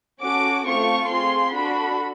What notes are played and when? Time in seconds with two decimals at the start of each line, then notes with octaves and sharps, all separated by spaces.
0.20 C#4 F#4 A4 D6
0.65 A3 C4 F4 A4 C#6
1.08 C4 F4 G#4 C6
1.53 D4 F#4 A4 B5